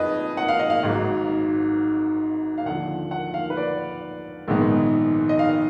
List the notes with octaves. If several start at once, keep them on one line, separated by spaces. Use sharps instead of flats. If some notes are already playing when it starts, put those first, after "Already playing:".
Already playing: F2 F3 G#4 B4 D#5
F#5
F5
D#5
F5
G#1 G#2 F#3
F5
D#2 D3 F3 F#5
F#5
F5
B4
D5
A#1 G#2 D#3 G#3 B3
D#5
F5